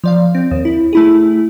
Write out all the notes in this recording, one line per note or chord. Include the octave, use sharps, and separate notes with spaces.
F3 D5 F5
C4
D#2
E4
A3 E4 G#4